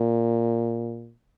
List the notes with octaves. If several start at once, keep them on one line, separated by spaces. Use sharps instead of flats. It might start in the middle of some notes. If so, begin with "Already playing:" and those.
Already playing: A#2